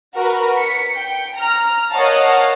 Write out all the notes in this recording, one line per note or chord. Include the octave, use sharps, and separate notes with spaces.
F#4 A#4 B4
B6 C#7
G5
A#5 F6
A#4 C#5 D#5 F5 F#5 A5